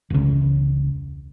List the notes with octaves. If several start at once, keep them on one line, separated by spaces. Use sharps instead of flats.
E1 C#2